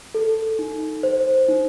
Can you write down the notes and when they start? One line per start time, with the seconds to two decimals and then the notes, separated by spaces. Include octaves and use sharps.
0.15 A4
0.59 D#4
1.03 C5
1.48 D#4